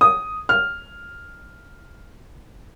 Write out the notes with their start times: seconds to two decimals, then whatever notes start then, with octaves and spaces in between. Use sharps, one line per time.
0.01 D#6
0.49 F6